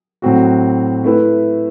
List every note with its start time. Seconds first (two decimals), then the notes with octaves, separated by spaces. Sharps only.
0.22 A2 F#3 C4 F#4
1.04 A3 E4 B4